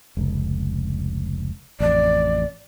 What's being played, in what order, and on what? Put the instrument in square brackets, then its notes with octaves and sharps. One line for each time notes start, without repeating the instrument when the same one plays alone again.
[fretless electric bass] F1 C#2
[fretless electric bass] A1 F2 [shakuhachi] D5